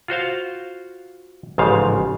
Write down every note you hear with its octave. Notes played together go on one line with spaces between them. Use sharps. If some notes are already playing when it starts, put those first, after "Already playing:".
F4 F#4 C5 F5
A1 G#2 C#3 F3 F5